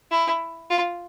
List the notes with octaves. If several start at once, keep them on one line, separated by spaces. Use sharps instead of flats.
E4
F4